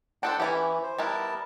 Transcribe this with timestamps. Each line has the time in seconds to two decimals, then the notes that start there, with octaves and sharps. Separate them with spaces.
0.23 D4 A4 C5 F#5 G5 A5
0.40 E3 C#4 E4 G4
0.83 C5
0.98 G3 B3 E4 A#4 A5